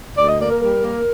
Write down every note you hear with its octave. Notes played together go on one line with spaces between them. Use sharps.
D2 D5
D#5
A#3 D5
A#4
G3 A#4
A#3